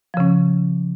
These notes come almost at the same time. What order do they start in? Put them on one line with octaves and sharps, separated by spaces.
F3 C#3 C#4